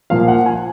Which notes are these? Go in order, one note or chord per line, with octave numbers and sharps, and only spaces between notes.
A#2 F3 A#3 F5
F#5
G#5